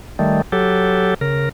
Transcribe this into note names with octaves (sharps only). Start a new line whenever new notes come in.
D#3 G3 A3
F#3 G4 A4
C#3 A#4